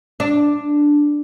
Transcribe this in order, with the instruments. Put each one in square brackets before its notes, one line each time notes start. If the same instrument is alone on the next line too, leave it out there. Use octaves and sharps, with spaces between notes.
[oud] D4